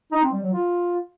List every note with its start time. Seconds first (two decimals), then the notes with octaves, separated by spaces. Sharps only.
0.12 D#4
0.22 C4
0.33 G3
0.43 F#3
0.53 F4